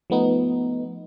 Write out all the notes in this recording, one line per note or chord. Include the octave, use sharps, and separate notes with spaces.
F3 A3 B3 D#4